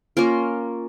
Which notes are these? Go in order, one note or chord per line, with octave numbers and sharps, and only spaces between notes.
A#3 C#4 F4 A#4